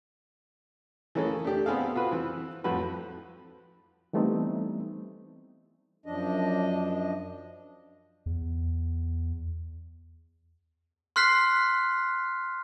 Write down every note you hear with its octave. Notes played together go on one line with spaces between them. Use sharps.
E3 A3 A#3 C#4 G#4 A4
A3 D4 G4
B3 C4 G#4 A4 F5
F4 F#4 B4
E3 C4
F2 A2 F#4 B4
E3 G3 A3 B3 C4 D#4
F#2 F3 D4 D#5
E2
C6 F6 F#6 B6 C7